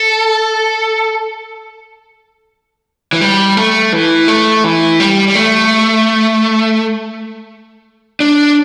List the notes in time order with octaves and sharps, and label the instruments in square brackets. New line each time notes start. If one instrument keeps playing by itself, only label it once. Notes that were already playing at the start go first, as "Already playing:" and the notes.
Already playing: [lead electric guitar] A4
E3
G3
A3
E3
A3
E3
G3
G3
A3
D4